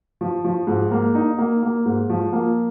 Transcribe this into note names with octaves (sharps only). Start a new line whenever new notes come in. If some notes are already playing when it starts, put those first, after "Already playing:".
F3
F3
G#2
A#3
D#4
A#3
A#3
G#2
F3
A#3